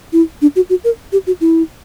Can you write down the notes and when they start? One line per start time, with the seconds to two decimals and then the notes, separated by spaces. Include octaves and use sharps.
0.13 E4
0.42 D4
0.56 F#4
0.70 F#4
0.84 A#4
1.12 G4
1.27 F#4
1.41 E4